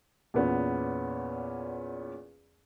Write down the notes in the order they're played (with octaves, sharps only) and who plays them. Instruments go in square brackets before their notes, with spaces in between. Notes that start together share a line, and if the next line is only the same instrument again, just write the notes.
[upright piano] E2 A#2 B3 C#4